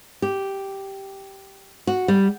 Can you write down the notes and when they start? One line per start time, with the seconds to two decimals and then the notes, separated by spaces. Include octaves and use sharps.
0.22 G4
1.87 F#4
2.08 G3